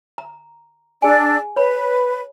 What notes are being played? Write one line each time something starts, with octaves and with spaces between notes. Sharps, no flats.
A#5
D4 G#4 D5 G#5 E6
B4 C#5 B5